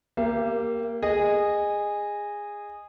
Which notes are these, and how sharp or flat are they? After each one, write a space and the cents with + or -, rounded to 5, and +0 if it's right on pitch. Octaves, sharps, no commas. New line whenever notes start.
A#3 +0 G4 +0 E5 +45
G#4 -15 D#5 -15